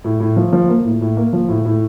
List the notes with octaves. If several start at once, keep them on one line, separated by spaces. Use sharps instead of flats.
A2
A2
F3
F3
A#3
A2
A2
A#3
F3
A2
A2